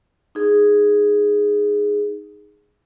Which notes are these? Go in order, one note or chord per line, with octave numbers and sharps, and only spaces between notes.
D#4 G#4